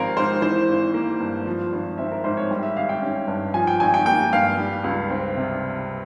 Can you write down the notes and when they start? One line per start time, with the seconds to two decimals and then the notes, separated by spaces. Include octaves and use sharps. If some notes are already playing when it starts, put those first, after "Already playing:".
Already playing: G#1 F3 C4 A#4 F5
0.17 G#2 C5
0.42 E3 C5
0.69 G#1
0.94 A#3
1.20 G2
1.47 F3
1.73 G#1
1.98 C4 E5
2.12 A#4
2.24 G#2 C5
2.37 C#5
2.51 G3
2.63 E5
2.77 G#1 F5
2.89 G5
3.02 C#4
3.28 G2
3.54 F3 G#5
3.67 G5
3.80 G#1 G#5
3.94 G5
4.06 A#3 G5
4.33 G2 F5
4.58 G3
4.84 C#2
5.10 C4
5.36 C3